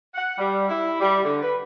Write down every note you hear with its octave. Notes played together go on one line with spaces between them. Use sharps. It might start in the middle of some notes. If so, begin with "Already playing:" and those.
F#5
G3
E4
G3
D3
B4